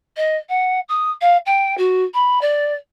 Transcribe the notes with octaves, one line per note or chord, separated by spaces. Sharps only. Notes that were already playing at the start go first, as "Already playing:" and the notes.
D#5
F#5
D#6
F5
G5
F#4
B5
D5